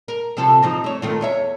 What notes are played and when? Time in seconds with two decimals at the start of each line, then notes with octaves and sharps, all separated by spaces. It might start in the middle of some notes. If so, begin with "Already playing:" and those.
0.08 A#4
0.37 C3 F3 A4
0.62 E3 F3 D#4
0.84 A3 C#5
1.02 D#3 A3 F4
1.21 E2 C#5 E5